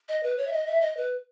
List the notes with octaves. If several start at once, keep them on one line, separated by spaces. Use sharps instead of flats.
D#5
B4
C#5
E5
D#5
E5
D#5
B4